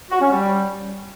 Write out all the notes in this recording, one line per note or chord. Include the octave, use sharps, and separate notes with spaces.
F#4
C#4
G3